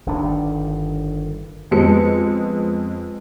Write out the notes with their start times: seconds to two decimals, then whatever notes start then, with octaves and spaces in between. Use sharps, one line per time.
0.06 G1 G2 D#3 D4
1.71 F2 G#3 B3 C#7